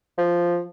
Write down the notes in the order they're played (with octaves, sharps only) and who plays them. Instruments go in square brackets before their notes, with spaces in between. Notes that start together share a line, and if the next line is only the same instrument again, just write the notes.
[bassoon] F3